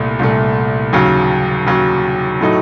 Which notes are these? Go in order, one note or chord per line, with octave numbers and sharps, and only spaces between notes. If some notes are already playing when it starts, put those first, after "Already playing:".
Already playing: C2 A#2 A3
C2 A#2 A3
D#2 C#3 F#3
D#2 C#3 F#3
A2 F#3 A3 D#4